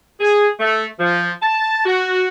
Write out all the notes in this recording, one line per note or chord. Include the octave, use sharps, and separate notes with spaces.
G#4
A3
F3
A5
F#4